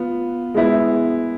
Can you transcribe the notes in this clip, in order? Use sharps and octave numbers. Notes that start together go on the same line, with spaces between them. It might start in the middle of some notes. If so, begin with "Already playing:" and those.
Already playing: B3 F4
G#3 B3 E4